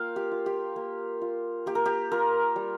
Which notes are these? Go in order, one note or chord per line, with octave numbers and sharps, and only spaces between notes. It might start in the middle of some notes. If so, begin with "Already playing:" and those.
Already playing: A#3 F4 F5 G5
G4
F4
G4
A#3
F4
A#3 G4
A#4
G4
F4 A#4
G3